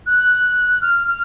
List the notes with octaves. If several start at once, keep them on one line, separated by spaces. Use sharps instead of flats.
F#6
F6
F6